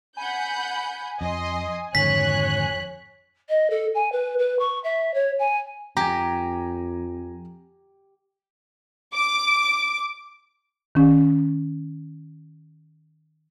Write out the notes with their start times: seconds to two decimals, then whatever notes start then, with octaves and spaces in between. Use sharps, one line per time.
0.17 F#5 G#5 B5 G6
1.21 F2 D#5 C6
1.95 G#1 F2 D3 E3 C#5 F#6 B6
3.49 D#5
3.70 A4
3.94 G#5
4.12 B4
4.38 B4
4.59 C#6
4.83 E5
5.14 C#5
5.39 G#5
5.97 F2 G4 G#5 A#5
9.15 D6
10.95 D#3 C#4